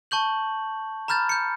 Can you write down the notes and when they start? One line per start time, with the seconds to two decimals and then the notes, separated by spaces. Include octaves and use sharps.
0.11 A5 C#6 G6 F#7
1.08 A#5 B5 F6 G6 A6
1.29 G6 C#7